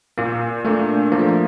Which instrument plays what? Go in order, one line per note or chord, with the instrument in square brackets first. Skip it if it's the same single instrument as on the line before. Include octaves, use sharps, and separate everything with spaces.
[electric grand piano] A#2 [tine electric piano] A#3
[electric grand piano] A3 D4 [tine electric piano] A#3
[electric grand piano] F3 [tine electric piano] A#3
[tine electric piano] A3
A#3